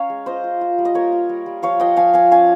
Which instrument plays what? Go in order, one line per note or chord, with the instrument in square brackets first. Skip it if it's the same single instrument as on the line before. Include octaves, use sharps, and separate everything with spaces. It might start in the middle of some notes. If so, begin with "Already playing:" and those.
Already playing: [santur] C#4 C#5 F5 A#5
G#3
F4 C5 D#5
F4
F4
G3
D#5
A#3 A#4 C#5
F4
G3
G3
F3 C#5 F5
F3 D#5 G5
F3 F5 G#5
F3 F5 G#5
C#4 F5 G#5